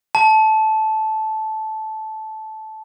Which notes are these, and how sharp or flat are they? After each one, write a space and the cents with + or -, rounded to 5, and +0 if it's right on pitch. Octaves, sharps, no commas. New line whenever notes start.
A5 -15